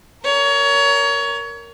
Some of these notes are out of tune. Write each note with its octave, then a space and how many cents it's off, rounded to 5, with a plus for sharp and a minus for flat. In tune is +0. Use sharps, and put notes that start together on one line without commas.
A#4 -5 C#5 +25